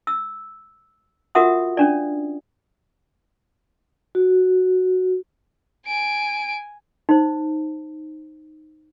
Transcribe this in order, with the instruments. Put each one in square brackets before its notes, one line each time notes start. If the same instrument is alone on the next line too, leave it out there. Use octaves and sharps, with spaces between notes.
[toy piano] E6
F4 F#4 A#4 E5 F#5 D#6
C#4 D4 D5
[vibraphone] F#4
[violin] G#5 D7
[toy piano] D#4 C5